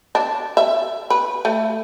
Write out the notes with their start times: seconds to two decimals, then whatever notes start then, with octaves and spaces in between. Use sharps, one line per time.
0.15 D4
0.57 E5
1.10 B4
1.45 A3